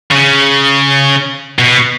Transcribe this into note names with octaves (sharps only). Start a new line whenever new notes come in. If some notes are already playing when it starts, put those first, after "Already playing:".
C#3
B2